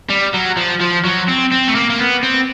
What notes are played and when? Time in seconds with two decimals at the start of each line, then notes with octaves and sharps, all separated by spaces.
0.10 G3
0.34 F#3
0.57 F3
0.81 F3
1.05 F#3
1.28 C4
1.52 C4
1.68 A3
1.75 A#3
1.90 A#3
1.99 B3
2.23 C4